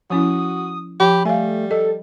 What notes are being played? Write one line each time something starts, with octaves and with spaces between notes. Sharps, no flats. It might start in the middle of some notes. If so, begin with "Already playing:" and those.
F3 C#4 E4 F#4 D#6
F3 G4 B5
G3 A3 F5 G#5
A4 D#5